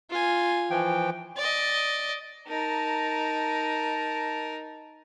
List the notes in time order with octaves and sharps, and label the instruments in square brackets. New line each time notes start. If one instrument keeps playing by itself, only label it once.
[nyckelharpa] F4 G#5
[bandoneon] E3 F3 G5
[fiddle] D5 D#5
[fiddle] D#4 A#4 [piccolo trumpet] A5